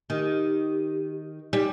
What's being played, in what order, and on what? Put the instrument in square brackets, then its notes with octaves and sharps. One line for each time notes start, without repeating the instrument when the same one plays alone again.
[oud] D#3 [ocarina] G4
[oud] G3 [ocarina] D#4